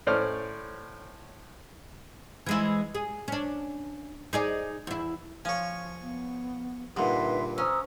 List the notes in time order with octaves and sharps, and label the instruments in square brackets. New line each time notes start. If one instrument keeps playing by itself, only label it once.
[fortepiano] A2 C#4 C5 D5 F6
[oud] E3 G#3 E4
G#4
C#4 D4
D#4 G#4 D5
E2 E4
[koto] F3 [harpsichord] C#5 G#5
[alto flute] B3
[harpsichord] G2 A#2 [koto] D3 [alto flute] D#4 [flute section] B4 E5 C6
[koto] C#4 [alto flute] C5 [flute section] A#5 D#6 E6